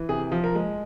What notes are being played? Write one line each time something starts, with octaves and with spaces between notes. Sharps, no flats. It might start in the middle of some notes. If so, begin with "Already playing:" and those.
Already playing: E3
C3 G#4
F3
A#4
G#3